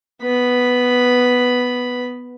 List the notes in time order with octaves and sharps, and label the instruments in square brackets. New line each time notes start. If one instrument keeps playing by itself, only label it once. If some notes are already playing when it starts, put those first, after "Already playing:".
[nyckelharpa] B3 B5